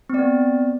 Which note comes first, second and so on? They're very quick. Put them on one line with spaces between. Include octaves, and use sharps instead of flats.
C4 D5 B3